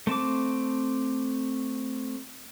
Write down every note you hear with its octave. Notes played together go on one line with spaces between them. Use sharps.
A3 C4 A5 D6